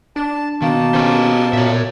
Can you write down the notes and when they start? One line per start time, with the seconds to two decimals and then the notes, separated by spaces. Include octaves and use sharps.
0.16 D4 A5
0.62 B2 D#3 A#3 A5
0.94 C#4 G4 B4 C5
1.53 A#2 C#5 E5